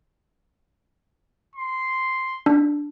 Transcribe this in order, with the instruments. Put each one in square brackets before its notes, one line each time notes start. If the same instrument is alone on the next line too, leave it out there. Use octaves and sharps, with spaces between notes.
[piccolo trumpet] C6
[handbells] D4